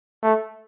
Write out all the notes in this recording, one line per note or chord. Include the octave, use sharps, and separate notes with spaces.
A3